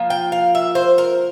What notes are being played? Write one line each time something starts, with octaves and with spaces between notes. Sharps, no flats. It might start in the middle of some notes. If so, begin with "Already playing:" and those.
Already playing: F3 A#3 F4
G5
F5
E5
C5
A#4